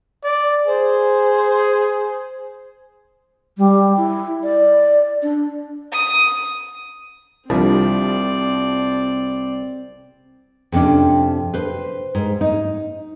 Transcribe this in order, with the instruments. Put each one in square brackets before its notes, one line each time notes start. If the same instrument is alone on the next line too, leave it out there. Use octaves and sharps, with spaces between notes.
[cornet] D5
[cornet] G#4 [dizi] C5
[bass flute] G3
E4
D5
D4
[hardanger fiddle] D#6
[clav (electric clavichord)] C2 [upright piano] F3 G3 D4 [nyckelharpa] C4 D5
[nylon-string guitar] F2 C3 C#4 D4
B4 C5
G#2
D#4